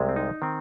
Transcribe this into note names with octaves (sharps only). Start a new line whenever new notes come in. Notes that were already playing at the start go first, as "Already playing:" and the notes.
Already playing: C2 C3 G#3
C4
D#4
D#3 C4